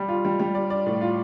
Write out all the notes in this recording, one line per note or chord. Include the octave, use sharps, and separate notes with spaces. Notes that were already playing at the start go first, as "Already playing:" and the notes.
Already playing: G3 D5
F4
G3
G3
D5
D5
A2
F4